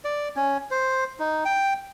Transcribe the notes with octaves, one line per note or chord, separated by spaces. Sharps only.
D5
C#4
C5
D#4
G5